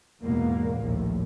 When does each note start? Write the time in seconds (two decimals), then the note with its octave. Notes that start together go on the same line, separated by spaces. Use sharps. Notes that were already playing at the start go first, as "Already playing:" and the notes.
0.23 E2 G#2 B2 A#3
0.77 A#1 D#2 A2